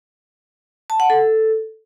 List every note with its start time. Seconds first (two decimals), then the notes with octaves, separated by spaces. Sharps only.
0.90 A5
1.00 F#5
1.10 A4